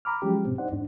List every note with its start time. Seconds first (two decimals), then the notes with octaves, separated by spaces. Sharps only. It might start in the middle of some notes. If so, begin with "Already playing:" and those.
0.05 A#5 B5 D6 F6
0.22 F3 F#3 G#3 C#4 G4
0.45 G#2 B2 C4
0.58 D#4 C5 D5 F#5
0.72 E2 G#2 D4